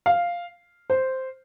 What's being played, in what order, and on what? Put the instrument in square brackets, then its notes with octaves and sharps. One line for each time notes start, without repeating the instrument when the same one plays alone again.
[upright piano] F5
C5